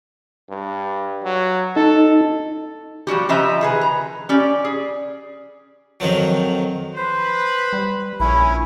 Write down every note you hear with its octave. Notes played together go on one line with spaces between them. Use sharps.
G2
F#3
D#4 A4
F3 G3 F#4 G4
C#3 F3 G4 D#5 E5 A#5
D#3 G#4 B4
A#5
C#4 G4 D5
G#4
F2 D#3 F3 F#3
B4 C5 B5
G3
A#1 C#4 E4 B5